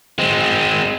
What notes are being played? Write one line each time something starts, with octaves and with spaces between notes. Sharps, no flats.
G#3 C4